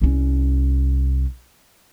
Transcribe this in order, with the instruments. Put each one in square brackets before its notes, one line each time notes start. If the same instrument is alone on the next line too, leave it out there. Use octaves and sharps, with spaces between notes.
[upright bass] C2 C#4